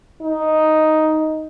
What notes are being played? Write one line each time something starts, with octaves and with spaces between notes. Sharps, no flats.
D#4